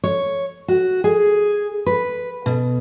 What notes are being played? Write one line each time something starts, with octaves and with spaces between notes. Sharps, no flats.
C#5
F#4
G#4
B4
B2